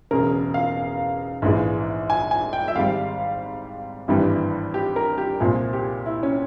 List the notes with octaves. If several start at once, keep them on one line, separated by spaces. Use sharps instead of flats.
E1 E2 C#3 A#4
F5
A#1 G#2 E3 G#3
G#5
G#5
G5
E5
G#1 G#2 G3 F5
G#1 G2 E3 G3
G4
A#4
G4
C2 A#2 F3 G#3 G#4
G4
E4
C#4